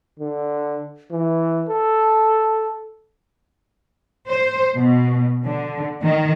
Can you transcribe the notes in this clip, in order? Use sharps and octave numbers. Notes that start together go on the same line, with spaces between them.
D3
E3
A4
C5
B2
D3
D#3